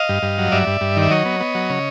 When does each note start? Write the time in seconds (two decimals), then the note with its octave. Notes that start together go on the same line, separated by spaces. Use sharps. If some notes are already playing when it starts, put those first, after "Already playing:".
Already playing: D#5 F5
0.09 G2
0.23 G2
0.38 F#3
0.52 G2 D5 E5
0.67 G2
0.81 G2
0.97 D#3
1.02 E5
1.11 F#3 C#5 D#5
1.25 B3
1.40 B3
1.55 F#3
1.70 C#3